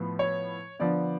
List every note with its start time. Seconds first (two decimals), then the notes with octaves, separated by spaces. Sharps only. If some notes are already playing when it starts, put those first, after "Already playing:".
Already playing: A2 F3 B3
0.19 C#5
0.79 D3 F3 B3 D5